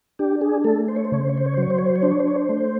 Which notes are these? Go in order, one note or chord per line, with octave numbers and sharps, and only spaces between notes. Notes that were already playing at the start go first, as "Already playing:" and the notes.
D4 G4
G#4
A3 A4
C5
C#5
C5
C#3 C#5
C5
C#5
C5
C#5
C5
F#3
C#5
C5
C#5
C5
C#5
D4 C5
C#5
C5
C#5
C5
A3